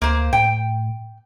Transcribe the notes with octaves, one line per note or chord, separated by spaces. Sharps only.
D2 A#3 C5
A2 G5